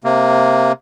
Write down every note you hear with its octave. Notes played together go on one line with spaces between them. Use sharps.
C3 A#3